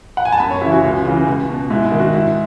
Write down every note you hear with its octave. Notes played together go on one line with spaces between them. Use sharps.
F#5
G#5
A5
F#2 B5
C#5
C#3 E3 E4
F#4
C#2
C#3 E3
C#2
B2
G#2 E4
E4
D#3
F#4
G#2 E4